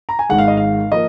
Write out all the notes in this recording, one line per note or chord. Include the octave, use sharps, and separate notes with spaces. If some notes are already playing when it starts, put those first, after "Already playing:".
A#5
G#5
G#1 G#2 D#3 G#3 F#5
F5
D#5
F5
F3 A#3 D#5